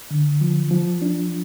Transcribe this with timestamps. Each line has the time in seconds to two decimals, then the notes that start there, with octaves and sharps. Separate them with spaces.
0.11 D3
0.41 F3
0.71 F3
1.02 D4